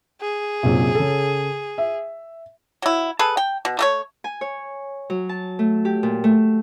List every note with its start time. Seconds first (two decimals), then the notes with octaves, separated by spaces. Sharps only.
0.21 G#4
0.63 A#1 F#2 C3
0.95 C#3 A4
1.78 E5
2.82 F#3 E4
3.19 G#4 A4 B4
3.37 G5
3.65 B2
3.79 A3 A4 C#5
4.24 G#5
4.41 C#5
5.10 F#3
5.29 A5
5.59 A3
5.85 G4
6.03 A#2
6.24 A3